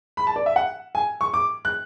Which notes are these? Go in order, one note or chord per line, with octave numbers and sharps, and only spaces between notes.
B5
A5
D5
E5
F#5
G#5
C#6
D6
F#6